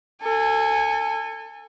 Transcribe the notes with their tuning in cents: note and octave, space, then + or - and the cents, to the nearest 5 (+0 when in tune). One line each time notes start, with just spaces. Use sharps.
A4 +25 G#5 -15